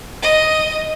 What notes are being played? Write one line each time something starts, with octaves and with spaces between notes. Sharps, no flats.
D#5